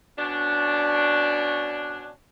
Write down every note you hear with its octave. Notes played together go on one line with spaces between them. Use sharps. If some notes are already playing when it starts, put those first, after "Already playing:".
B2 C#4 D4